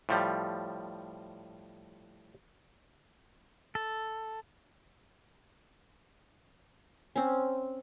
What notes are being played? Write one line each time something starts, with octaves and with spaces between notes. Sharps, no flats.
A2 F3 G3
A4
C4 C#4